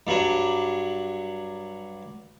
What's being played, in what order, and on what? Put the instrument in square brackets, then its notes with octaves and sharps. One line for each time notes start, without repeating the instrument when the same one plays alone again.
[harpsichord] G2 F#3 D4